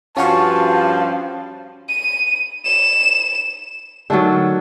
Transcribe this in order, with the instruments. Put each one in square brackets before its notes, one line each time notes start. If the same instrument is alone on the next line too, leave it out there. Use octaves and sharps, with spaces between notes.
[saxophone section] G2 F3 [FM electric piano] C#4 F#4 C#5 [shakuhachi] F5 [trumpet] A5
[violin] D#7
E7
[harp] D3 F#3 [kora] D#3 A3 A4